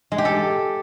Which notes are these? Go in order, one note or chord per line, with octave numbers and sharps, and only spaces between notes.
G#3
G4
A4